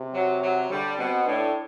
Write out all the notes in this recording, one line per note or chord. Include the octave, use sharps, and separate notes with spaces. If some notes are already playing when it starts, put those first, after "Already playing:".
Already playing: C3
F#3
F#3
D3 G3
B2 C4
A2 D4